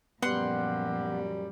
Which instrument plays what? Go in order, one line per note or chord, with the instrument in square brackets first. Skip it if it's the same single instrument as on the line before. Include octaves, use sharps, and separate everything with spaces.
[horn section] F#2 G3 [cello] A#2 F3 [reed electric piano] B3 [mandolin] F#5 C6